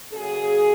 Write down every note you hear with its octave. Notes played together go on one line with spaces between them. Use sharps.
C#3 F#3 A#3 G#4